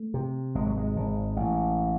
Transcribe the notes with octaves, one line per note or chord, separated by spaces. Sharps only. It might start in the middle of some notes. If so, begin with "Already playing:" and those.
Already playing: A3
C3
G#1 G#3
F#3
G#3
G#1
A1